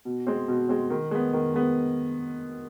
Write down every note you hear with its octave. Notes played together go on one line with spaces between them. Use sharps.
B2
G#3 C4
B2
G#3 C4
D#3
G#3 B3
D#3
G#3 B3